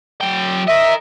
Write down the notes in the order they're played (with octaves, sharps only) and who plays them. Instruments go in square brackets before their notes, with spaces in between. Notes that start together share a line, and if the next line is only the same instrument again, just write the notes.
[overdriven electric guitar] F#3 G5
[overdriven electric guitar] A#4 D#5 [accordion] E5